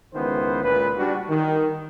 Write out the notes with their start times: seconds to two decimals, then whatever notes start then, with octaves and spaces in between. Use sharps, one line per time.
0.14 C#2 D#3 E3 B3 C5
0.64 C#2 A#2 B4
0.97 G3 D4 F#4
1.30 D#3